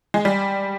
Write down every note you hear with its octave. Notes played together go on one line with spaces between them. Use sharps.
G#3
G3